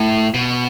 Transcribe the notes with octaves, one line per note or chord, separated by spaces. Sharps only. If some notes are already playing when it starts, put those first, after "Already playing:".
Already playing: A2
B2